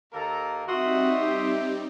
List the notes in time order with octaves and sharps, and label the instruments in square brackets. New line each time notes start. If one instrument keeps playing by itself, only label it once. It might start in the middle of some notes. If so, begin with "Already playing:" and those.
[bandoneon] D#2 A#3 A#4 [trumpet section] A4 A#5
[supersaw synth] G3 C4 D#4 [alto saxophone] F#4 [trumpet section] E5 [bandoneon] C6 D#6
[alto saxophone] G4